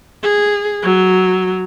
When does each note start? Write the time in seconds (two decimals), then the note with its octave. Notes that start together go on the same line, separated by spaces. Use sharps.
0.22 G#4
0.82 F#3